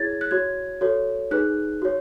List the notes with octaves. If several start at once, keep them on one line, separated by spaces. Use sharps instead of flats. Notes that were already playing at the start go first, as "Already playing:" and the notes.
Already playing: E4 G#4 C#5 G#6 A6
F#6
F#4 C#5 G#6
F#4 A4 C#5
D#4 G#4 B4 F#6
F#4 C#5